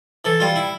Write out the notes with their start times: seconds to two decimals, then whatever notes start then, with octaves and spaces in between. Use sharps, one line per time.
0.25 E3 A4
0.40 G3 F4
0.56 E4